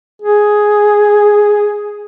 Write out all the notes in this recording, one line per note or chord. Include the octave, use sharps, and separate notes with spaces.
G#4